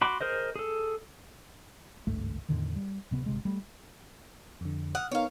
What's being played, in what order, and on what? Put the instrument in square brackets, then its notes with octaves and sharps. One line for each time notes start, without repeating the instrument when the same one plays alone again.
[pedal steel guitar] F#4 B5 C6 D6
G#4 A#4 C5 D#5
G#4 A4
[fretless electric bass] G#1 C#2 G2 A3
E2 A2 D3 D#3
G3
D1 C3 B3
G1 C3 G#3
G3 A3
[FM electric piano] F2 D3
[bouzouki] F#5 [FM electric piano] D#6 F6
[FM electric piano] B3 D#4 A#4 [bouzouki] C#5 F5